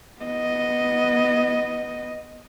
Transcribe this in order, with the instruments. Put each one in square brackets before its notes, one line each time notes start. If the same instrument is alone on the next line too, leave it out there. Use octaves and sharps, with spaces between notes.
[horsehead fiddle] B3 D#5